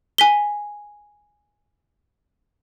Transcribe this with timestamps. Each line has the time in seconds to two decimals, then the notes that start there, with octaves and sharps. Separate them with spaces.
0.18 G#5 B6 G7